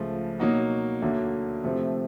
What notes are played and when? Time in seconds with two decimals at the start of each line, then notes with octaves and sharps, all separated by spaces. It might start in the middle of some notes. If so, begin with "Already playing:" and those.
Already playing: C#2 C#3 F3 A3
0.39 B2 F#3 A#3 D#4 F#4
1.02 D2 D3 F#3 A#3
1.64 C3 F3 A3 C4